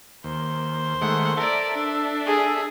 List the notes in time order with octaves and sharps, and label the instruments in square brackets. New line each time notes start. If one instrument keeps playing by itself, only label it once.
[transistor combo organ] D#2 [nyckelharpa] C5
[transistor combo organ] D#3 G#3 A3 [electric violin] F#5
[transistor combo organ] A4 E5 [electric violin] A#4 D5
[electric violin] D4
[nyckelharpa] G#4